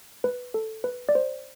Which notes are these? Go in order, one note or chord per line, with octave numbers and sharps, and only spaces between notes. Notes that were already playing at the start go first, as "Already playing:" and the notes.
B4
A4
B4
D5
C5